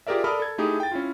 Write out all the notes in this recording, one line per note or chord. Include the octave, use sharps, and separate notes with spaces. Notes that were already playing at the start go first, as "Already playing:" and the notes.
F4 G4 G#4 A#4 D5 E5
A4 A#4 D5 B5 D#6 F6
A4 G#6
A3 D#4 E4 G4 G#4
G5 A6
C#4 E4 F4